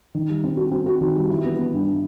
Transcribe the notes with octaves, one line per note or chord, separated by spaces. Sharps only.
D#3
G3
C4
F#4
C4
F#4
D#3
G3
E3
B3
B3
G2